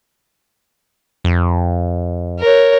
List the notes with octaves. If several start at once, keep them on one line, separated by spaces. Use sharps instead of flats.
F2
A#4 C#5